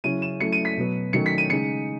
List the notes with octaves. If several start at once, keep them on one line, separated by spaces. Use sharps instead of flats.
C#3 F#3 C#4 E4 D#7
E7
F#3 A3 C#4 E4 C#7
D#7
B6
B2 F#3 B3
D#3 F#3 A3 C#4 C#7
B6
D#7
C#3 G#3 D#4 C#7